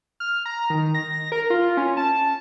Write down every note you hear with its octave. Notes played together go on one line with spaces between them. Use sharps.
F6
A#5
D#3
A#6
A#4
F4
C#4
A5